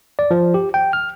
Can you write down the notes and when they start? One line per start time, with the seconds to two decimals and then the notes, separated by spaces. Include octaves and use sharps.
0.19 D5
0.31 F3
0.54 G4
0.74 G5
0.93 F6